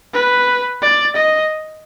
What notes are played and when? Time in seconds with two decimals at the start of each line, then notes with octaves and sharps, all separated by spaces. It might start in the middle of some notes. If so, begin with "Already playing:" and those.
0.14 B4
0.82 D5
1.16 D#5